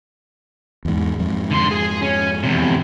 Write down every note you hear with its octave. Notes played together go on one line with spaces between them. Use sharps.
E2 G#2
F2 G#2
D3 C6
G#4
C#4
E2 C3